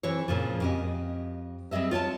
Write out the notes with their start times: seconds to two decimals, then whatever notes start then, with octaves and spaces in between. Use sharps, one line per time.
0.03 E3 C4 G#4 C#5
0.28 A#2 C#3 F3
0.60 F2 G4 D#5
1.71 G3 C4 G#4 D#5 E5
1.91 F4 C#5 G5 A5